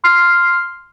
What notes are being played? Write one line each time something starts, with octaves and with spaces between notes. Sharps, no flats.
C6 F6 C7